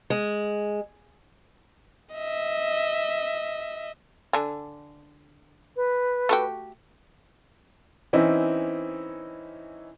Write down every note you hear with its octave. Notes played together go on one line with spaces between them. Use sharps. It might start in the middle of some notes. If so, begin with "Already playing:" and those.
G#3
D#5 E5
D3 D4 G#5
B4
A3 F#4 G4
E3 C4 C#4 D#4 E4